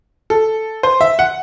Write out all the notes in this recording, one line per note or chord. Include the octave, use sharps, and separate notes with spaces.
A4
C5
E5
F#5